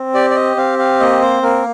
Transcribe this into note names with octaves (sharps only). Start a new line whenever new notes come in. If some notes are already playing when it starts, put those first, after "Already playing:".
Already playing: C4
G4 D5
D5
D#5
C4 F5
F5
A#3 D#5
C5
A#3 A#4